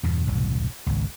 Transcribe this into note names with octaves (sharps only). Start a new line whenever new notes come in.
E2 G2 B2
E1 C2 A2
G#1 C#2